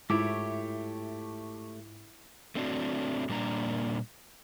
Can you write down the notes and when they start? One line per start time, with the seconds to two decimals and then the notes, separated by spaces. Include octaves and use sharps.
0.10 G#2 A3 E4 F4 G4 C#5 D6
2.55 A3 C4 D4 F#4
3.29 A#2 G3 A#3 D4 A#5